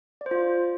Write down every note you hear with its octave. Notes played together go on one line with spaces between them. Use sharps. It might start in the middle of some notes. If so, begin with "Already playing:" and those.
D5
C5
F4